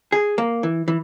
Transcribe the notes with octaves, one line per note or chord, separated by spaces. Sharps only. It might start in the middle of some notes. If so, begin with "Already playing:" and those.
G#4
A#3
E3
E3